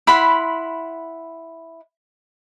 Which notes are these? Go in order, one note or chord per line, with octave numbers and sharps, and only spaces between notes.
E4 F#5 B5 C6